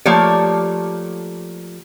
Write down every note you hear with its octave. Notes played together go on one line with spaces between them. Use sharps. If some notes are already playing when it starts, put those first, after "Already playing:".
F3 A3 A#3 G4 C#5 D5